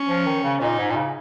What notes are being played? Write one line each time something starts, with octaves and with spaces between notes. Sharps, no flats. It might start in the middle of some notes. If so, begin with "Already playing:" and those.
Already playing: C#4
F3
D#3
C#3
A#2 D#4
G#2
A#2
C#3